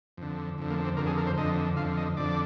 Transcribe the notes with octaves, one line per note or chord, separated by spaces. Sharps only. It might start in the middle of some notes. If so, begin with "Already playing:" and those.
F2 D3
F2 D3
A#3
C4
F2 D3 A#4
G#4
A#4
C5
F2 D3 D#5
F2 D3 F5
D#5
F2 D3 D5